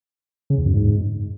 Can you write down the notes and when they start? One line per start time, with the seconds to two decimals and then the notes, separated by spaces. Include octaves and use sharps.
0.50 C#3
0.58 E2
0.66 F#2
0.74 G#2